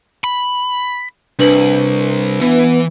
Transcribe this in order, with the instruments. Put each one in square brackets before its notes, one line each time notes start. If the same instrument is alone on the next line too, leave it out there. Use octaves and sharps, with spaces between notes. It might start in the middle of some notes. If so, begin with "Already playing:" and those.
[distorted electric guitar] B5
[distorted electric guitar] C2 [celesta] D4 B4 F#7
[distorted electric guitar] E3 [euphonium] B3